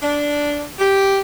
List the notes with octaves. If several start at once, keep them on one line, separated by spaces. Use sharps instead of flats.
D4
G4